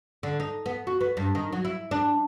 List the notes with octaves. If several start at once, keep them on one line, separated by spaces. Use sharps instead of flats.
D3
D#4
B3
F#4
B3
G2
D#3
F#3
E4
D4